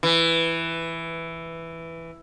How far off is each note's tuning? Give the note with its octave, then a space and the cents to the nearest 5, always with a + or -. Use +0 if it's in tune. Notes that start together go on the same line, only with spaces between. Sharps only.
E3 +5